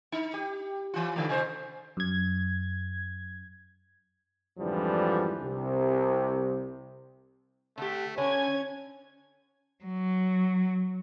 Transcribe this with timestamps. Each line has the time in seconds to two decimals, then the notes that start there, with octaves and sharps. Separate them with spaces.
0.12 D#4
0.34 G4
0.94 E3 F4
1.16 D3 G3 A3
1.29 C3 C5
1.97 F#2 G#6
4.59 F2 G#2 D3 E3 F3 G3
5.42 C2 C3
7.78 D3 A3 G4
8.18 D3 C#4 C#5 G#5 G#6
9.85 F#3